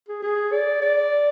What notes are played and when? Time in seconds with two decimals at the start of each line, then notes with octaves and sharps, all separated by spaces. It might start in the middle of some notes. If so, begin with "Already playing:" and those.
0.08 G#4
0.23 G#4
0.52 D5
0.82 D5